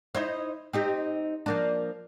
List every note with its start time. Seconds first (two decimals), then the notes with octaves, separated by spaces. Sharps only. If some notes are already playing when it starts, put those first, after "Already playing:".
0.15 D#4 E4 C5
0.73 C4 D#4 G4
1.46 F3 A#3 D4